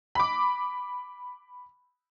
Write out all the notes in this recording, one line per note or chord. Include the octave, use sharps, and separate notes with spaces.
B5 D6